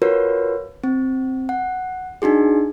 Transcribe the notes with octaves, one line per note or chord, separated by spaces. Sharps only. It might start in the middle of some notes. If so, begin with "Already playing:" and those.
F4 F#4 A#4 B4 C#5
C4
F#5
D4 D#4 F#4 G#4